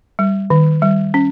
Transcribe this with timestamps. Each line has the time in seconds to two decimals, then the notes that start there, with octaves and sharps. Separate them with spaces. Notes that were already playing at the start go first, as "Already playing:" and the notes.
0.19 G3
0.50 D#3
0.82 G3
1.14 C#4